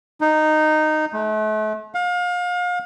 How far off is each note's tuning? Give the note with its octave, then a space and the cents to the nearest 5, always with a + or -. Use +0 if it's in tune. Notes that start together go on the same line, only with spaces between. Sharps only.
D#4 -10
A3 -40
F5 +35